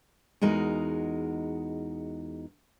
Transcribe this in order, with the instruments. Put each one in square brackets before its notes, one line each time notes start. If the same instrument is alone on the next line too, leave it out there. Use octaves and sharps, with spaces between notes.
[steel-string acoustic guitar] E2 G#3 D#4 F#4 A#4